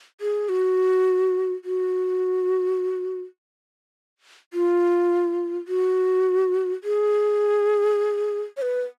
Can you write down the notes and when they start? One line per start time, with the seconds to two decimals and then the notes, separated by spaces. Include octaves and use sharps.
0.21 G#4
0.49 F#4
1.65 F#4
4.53 F4
5.68 F#4
6.84 G#4
8.57 C#5
8.62 B4